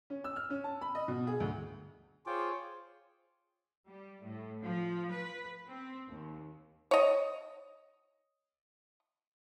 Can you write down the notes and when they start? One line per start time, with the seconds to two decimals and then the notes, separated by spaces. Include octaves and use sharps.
0.10 C#4
0.24 E6
0.36 F6
0.50 C#4
0.64 A5
0.81 B5
0.95 D#5
1.08 B2
1.27 G#4
1.40 D2
2.26 F4 G#4 C5 C#5 G5 D6
3.88 G3
4.21 A2
4.63 F3
5.12 B4
5.68 C4
6.09 D#2
6.91 C#5 D#5